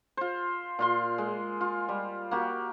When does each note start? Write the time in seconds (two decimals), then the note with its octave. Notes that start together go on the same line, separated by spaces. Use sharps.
0.17 F4 C5
0.79 A#2 F4 C6
1.18 G#3
1.61 F4
1.89 G3
2.31 A#3 F#4 G4